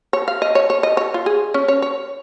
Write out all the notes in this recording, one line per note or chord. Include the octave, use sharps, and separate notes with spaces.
C#5
F5
D#5
C#5
C#5
D#5
C#5
F4
G#4
C#4
C#5
C#5